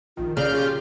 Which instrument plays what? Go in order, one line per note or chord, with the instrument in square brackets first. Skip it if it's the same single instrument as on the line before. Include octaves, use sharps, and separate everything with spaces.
[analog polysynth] A#1 D#3 [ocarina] F4
[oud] C#3 [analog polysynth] A#3 [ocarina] D5 [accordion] F6 G6
[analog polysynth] F4 G4 [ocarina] G#4